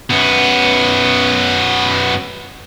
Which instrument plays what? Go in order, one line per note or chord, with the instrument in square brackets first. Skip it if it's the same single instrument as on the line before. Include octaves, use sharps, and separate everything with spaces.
[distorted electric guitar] F#2 B3